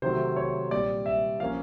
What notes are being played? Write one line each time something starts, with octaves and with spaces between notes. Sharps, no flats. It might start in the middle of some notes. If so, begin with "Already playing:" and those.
C3 D#3 F#3 A3 C5
C#5
A#2 G3 C4 D5
E5
F3 A#3 C#4 F5